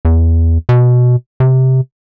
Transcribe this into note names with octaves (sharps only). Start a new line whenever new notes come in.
E2
B2
C3